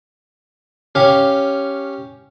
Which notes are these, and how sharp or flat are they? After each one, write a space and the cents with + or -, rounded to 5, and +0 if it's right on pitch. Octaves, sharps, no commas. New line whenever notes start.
C#4 +0 G4 +0 F5 +0